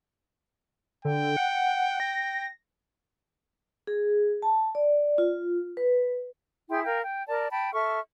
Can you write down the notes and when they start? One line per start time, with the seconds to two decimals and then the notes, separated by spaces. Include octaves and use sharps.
1.05 D3 G5
1.37 F#5
2.00 A#6
3.87 G#4
4.42 A5
4.75 D5
5.18 F4
5.77 B4
6.69 E4 G#4 G5 C6
6.84 A#4 F5 G5
7.04 G5
7.27 A#4 D5 A5
7.50 G5 A5 B5
7.74 A4 E5 C#6 F6